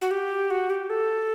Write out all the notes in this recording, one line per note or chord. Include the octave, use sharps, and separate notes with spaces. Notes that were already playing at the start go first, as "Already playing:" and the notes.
F#4
G4
F#4
G4
A4